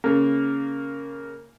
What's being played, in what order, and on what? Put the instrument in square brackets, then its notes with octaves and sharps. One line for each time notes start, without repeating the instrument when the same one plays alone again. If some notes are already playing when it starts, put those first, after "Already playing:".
[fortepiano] C#3 A#3